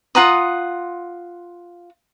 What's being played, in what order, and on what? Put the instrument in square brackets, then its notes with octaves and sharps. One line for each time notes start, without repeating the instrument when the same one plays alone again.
[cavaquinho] F4 F#5 A#5 D#6